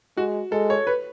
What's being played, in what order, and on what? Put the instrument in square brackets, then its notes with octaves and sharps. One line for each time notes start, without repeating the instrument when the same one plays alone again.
[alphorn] G#3 [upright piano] F#4
[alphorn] G#3 [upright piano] A4
[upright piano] C#5
B4